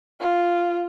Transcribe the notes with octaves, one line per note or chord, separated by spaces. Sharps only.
F4